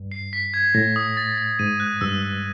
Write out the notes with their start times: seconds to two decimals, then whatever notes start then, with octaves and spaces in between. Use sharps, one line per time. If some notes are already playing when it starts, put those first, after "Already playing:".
Already playing: G2
0.12 C7
0.33 B6
0.54 G#6
0.74 A2 A#6
0.96 D#6
1.17 A6
1.38 A6
1.59 G#2 D#7
1.80 F#6
2.01 G2 E6
2.22 E6